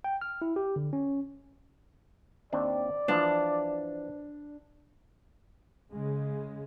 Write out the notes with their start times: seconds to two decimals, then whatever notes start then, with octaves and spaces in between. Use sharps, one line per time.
0.04 G5
0.21 F6
0.42 E4
0.56 G4
0.76 D3
0.93 C#4
2.53 D#2 C4 D4 D5
3.08 E3 F3 D4
5.91 C#3 G#3